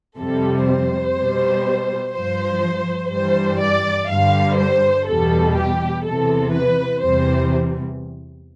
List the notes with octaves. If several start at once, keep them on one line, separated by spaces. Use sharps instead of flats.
F2 C3 G3 A4
C5
B2 G3
G2 F3 C5
G2 E3 G3 C5
D5
G2 D3 G3 F5
C5
E2 B2 G3 A4
G4
E2 C3 E3 A4
B4
E2 C3 E3 G3 C5